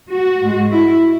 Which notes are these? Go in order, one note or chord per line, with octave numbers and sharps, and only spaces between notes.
F#4
G#2 G#3
E4